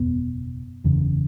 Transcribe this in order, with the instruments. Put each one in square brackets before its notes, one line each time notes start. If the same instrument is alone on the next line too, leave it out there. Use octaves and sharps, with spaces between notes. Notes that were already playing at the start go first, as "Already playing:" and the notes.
Already playing: [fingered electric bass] F#1 E2 B2 B3
F#1 E2 C#3